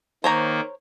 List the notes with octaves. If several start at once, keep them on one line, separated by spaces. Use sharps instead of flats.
D#3 A#3 C5 C#5 A#5